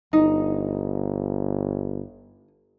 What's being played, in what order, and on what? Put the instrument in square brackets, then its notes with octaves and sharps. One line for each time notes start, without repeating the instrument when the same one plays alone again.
[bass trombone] G1 [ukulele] D#4